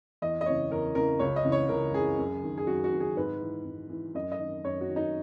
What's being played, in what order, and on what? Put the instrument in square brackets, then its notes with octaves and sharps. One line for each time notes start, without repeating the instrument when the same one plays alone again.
[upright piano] E2 D#5
D#5
C#3 E3 C#5
E2 A#4
C#3 E3 A#4
C#2 C#5
D#5
C#3 E3
C#5
C#2 A#4
C#3 E3 G#4
F#2
D#3
G#4
F#2 F#4
F#4
D#3
G#4
G#2 B4
E3
G#2
E3
F#2 D#5
D#5
D#3
F#2 C#5
F#4
D#3
D#4